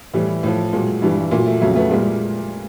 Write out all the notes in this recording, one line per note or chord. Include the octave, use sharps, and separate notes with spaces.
A2 E3 G3
A2 F3
A#2 F#3 G#3
G2 E3 G3
A#2 F#3 A3
A3
F2 C#3 F#3 A3
A3 B3
A#2 G3 G#3 A#3